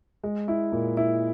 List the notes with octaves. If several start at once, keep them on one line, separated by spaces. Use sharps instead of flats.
G#3
E4
A#2
E4